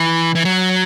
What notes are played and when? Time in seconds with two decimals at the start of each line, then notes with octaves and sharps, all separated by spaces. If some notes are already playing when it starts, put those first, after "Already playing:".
Already playing: E3
0.35 E3
0.45 F#3